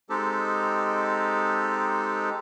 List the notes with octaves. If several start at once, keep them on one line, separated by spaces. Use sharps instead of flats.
G#3 C4 D#4 G4 A4